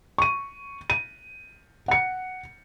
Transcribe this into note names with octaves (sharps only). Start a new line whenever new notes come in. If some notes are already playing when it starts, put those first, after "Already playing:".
C#6 D#7
D#7
F#5 C#7